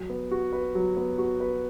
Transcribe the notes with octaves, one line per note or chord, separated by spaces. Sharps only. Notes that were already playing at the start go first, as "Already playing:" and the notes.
Already playing: F#3
B3
F#4
B4
F#3
B3
F#4
B4